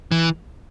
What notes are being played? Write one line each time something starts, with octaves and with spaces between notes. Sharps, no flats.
E3